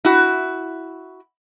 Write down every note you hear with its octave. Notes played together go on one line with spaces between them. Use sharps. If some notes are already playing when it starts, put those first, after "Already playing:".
E4 F#4